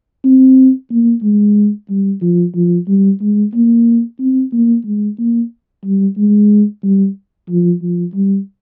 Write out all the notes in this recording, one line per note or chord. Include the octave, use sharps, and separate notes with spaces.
C4
A#3
G#3
G3
F3
F3
G3
G#3
A#3
C4
A#3
G#3
A#3
G3
G#3
G3
F3
F3
G3